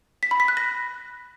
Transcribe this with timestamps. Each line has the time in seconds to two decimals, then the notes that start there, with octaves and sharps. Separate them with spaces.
0.23 B6
0.31 B5
0.40 B6
0.48 F#6
0.57 A#6